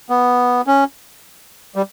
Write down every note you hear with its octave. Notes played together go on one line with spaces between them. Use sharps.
B3
C#4
G3